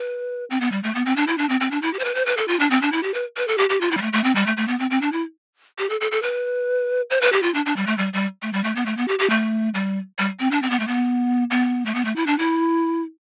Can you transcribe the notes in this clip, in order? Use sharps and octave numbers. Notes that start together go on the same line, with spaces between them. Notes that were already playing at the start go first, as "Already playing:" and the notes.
Already playing: B4
C4
B3
G3
A3
B3
C4
D4
E4
D4
C4
C4
D4
E4
G4
C5
B4
C5
B4
A4
F4
D4
C4
D4
E4
G4
B4
B4
A4
G4
G4
F4
E4
G3
A3
A3
C4
G3
A3
A3
B3
C4
C4
D4
E4
G4
A4
A4
A4
B4
C5
B4
G4
F4
D4
D4
G3
A3
G3
G3
A3
G3
A3
B3
A3
B3
G4
G4
A3
G3
G3
C4
D4
C4
B3
A3
B3
B3
A3
B3
A3
E4
D4
E4